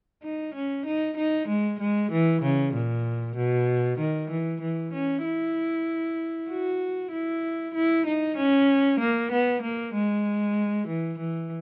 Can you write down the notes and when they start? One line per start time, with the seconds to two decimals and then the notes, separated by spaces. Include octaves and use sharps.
0.23 D#4
0.55 C#4
0.86 D#4
1.17 D#4
1.48 G#3
1.80 G#3
2.11 E3
2.42 C#3
2.74 A#2
3.36 B2
3.99 D#3
4.31 E3
4.61 E3
4.93 C#4
5.24 E4
6.49 F#4
7.12 E4
7.75 E4
8.06 D#4
8.37 C#4
8.99 A#3
9.31 B3
9.62 A#3
9.94 G#3
10.88 E3
11.19 E3